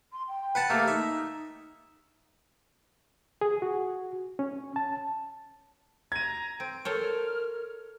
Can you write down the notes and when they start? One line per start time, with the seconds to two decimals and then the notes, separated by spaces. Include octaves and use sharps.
0.12 C6
0.28 G5
0.55 B4 F#5 A5
0.70 A3 A#3 G4
0.88 D#4 E5
3.41 G#4
3.62 F#4
4.39 C#4
4.76 A5
6.12 A#5 G#6 D#7
6.60 C4 D7
6.85 A4 A#4 C5 C#5 F6